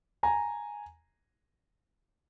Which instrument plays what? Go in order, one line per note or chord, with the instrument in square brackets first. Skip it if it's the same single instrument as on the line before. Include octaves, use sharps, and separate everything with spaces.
[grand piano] G#5 A#5